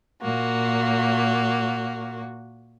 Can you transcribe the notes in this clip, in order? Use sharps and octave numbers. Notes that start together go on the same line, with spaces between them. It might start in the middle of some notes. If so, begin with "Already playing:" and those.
A#2 A#3 F#4